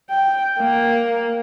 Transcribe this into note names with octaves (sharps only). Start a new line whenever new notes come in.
G5
A#3